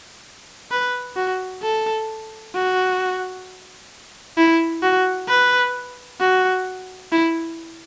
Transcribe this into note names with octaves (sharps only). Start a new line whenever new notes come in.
B4
F#4
A4
F#4
E4
F#4
B4
F#4
E4